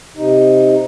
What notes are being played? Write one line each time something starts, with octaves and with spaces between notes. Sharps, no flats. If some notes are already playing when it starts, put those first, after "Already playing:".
C3 D#4